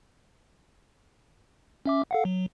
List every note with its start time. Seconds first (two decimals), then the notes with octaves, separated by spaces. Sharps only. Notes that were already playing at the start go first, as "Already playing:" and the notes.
1.86 C#4 E5 D6
2.11 A4 F5 F#5
2.25 F#3